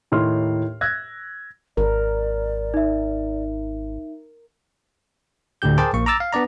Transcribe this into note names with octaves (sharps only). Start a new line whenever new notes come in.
D#2 A2 D#4 C6 F6
E6 F#6 G#6 A#6
G#1 A#4 D5
D#4 E5
D2 A2 D3 G4 G6
G#4 A#4 C5 G5 A5 D6
A#1 A#3 C#6
A#5 D6 E6 A6
F5
B3 D4 D5 A#5